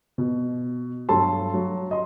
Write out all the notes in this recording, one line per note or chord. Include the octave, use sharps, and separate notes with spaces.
B2
G2 F#3 A4 A5 C6
F#3
D#5 C6